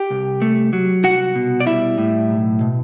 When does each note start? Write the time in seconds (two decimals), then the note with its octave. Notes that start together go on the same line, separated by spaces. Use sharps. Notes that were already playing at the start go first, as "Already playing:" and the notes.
Already playing: G4 G5
0.10 C2
0.42 A3
0.73 F#3
1.04 C2 F#4 F#5
1.35 B2
1.60 D5
1.66 G3 E4 E5
1.98 A2
2.29 B1
2.61 B2